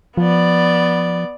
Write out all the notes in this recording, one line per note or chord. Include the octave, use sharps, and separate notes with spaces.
F3 B3 D5